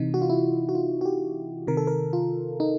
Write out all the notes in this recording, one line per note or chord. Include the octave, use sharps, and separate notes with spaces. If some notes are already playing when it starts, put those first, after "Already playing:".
Already playing: C3 E3 D#4
F#4
F4
E4
F#4
F4
F#4
G4
C3 D#3 A#4
A4
A#4
F4
D#4